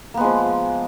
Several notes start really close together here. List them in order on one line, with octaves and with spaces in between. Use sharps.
A#3 B3 G#3 F3